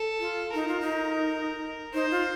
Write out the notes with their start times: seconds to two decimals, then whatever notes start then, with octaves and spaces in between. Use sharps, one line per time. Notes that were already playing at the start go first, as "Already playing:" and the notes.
Already playing: A4
0.19 F4
0.54 D#4 A#4
0.68 F4
0.81 D#4
1.94 D#4 C5
2.11 F4